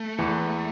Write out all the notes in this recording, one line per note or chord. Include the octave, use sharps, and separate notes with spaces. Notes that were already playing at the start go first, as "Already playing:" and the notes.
Already playing: A3
E2 E3